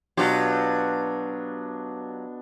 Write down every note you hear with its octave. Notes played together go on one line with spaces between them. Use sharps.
B2 F#3 D4 F4 G4